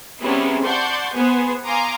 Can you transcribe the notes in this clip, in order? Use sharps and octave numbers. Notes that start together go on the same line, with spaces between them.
C3 G3 B3 C#4 E4 G#4
D5 F#5 A5 C6 C#6 G6
B3 G#4 C5
F5 G#5 A#5 C6 D6 D#6